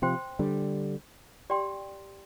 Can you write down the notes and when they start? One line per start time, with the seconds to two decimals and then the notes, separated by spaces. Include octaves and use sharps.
0.02 C3 F3 C5 G5 C6
0.39 D3 G3
1.50 G4 D5 G5 C6